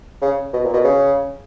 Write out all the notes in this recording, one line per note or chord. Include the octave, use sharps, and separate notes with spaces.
C#3
B2
A#2
B2
C#3